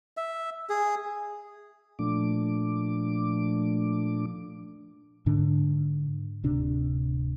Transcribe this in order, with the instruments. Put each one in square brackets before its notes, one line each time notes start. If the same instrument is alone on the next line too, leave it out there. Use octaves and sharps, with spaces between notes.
[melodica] E5
G#4
[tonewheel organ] A#2 F3 A3 D4 D6
[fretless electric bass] G#2 D3 D4
D1 C3 D4